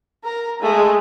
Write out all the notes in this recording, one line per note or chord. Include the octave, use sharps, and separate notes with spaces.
A#4 A#5
G#3 A3